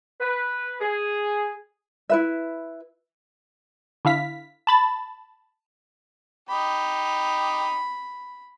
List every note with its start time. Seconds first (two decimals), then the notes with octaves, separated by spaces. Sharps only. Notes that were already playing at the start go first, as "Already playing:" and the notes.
0.21 B4
0.81 G#4
2.09 E4 B4 E5
4.05 D3 E4 F5 B6
4.67 A5 B5 A6
6.49 D#4 G4 B5